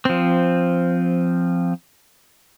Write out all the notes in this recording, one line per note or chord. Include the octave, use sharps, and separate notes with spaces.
F3 C4